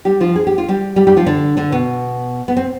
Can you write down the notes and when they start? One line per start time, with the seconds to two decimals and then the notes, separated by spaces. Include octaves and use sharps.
0.05 G3 G4
0.21 F3 F4
0.36 G#4
0.47 G4
0.58 F4
0.69 G3 G4
0.96 G3 G4
1.07 G3 G4
1.17 F3 F4
1.26 D3 D4
1.57 D3 D4
1.72 B2 B3
2.48 B3
2.57 C4